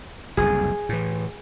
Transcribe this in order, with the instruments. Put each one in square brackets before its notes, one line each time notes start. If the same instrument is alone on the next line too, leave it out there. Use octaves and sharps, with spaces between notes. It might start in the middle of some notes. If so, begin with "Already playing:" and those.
[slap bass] F#1 C2 F2 [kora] G#4
[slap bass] A2 E3